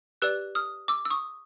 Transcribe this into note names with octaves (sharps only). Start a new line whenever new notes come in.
G4 B4 D5 E6 F#6
D#6 F6
D6 E6
E6
C#6 D#6